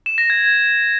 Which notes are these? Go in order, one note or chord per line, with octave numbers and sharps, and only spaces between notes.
E7
A#6
G#6